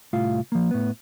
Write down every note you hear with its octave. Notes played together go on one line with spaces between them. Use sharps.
C2 A2 F4 F5
F3 A#3
A2 B3